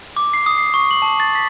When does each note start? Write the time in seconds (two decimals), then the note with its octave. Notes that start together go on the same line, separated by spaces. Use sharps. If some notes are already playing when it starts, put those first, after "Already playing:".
0.17 D6
0.33 C7
0.46 D#6
0.58 C7
0.74 C#6
0.91 F#7
1.02 A5
1.20 A6
1.35 B6